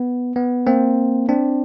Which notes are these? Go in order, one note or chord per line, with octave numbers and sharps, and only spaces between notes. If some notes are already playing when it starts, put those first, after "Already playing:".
Already playing: B3
B3
A#3 C4
C4 D4